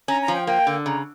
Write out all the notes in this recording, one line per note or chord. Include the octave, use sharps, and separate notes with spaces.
C#4 A#5
A#5
F3
G5
A#3 G5
D3
C#3 A#5